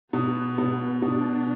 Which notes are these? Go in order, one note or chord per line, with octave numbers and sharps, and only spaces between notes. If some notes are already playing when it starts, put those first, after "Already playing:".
B2 B3
B2
B2 D4